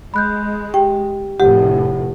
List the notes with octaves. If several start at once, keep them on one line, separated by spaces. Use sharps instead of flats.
G#3 B5 F#6 G6
G4 G5
F1 A2 G4 F#5